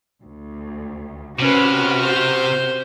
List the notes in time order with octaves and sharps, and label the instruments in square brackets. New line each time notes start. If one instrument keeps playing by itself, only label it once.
[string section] D2
[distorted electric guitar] C3 [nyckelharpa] C#4 B4 [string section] F#4 F6
[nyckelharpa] C5